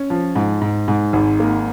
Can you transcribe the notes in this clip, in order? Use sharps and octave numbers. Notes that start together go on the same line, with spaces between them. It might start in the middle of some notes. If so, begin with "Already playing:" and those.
Already playing: C#4
F3
G#2
G#2
G#2
G#1
A#3